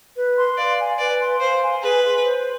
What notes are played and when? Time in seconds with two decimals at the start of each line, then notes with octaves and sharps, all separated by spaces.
0.16 B4
0.37 C6
0.57 D5 F5
0.78 G#5
0.99 B4 D5
1.20 C6
1.40 C5 F5
1.62 G#5
1.82 G#4 B4
2.03 C6
2.24 C5